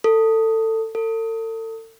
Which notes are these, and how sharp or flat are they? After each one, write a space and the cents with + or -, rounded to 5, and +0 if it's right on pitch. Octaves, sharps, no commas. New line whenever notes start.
A4 +20
A4 +40